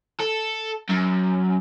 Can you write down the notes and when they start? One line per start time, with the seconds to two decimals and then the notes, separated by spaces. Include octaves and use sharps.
0.20 A4
0.89 F#2